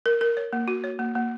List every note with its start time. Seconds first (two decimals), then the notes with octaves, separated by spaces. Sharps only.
0.06 A#4
0.21 A#4
0.37 C#5
0.53 A#3
0.68 F#4
0.84 C#5
0.99 A#3
1.15 A#3